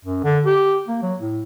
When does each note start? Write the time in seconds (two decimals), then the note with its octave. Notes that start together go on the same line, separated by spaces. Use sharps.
0.05 F#2
0.24 D3
0.46 G4
0.88 A#3
1.02 F#3
1.20 A2